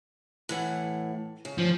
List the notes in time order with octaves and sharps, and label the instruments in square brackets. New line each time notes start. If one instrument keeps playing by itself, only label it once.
[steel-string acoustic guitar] A2 E3 F#5
C#3
[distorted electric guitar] F3